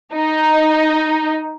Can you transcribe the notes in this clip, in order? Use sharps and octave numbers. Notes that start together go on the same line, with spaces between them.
D#4